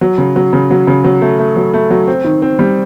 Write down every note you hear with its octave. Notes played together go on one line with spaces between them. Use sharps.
F#3
C#3
F#3
C#3
F#3
C#3
F#3
A3
A3
F#3
A3
F#3
C4
D#3
C4
G3